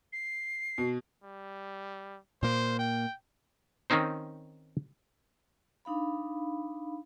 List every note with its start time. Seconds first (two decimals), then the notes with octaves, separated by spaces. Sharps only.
0.12 C7
0.78 B2
1.24 G3
2.43 A#2 A#3 C5
2.79 G5
3.90 D#3 C4 C#4 D#4 C5
5.85 D4 D#4 F5 B5